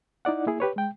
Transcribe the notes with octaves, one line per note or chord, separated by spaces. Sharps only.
D#4 E4 D5 F#5
A#3 E4 G#4
G4 B4 C#5
G#3 G5